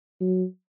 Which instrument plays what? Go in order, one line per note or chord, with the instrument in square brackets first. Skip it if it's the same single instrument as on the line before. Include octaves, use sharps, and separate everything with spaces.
[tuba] F#3